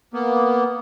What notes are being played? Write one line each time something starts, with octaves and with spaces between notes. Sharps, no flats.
A#3 B3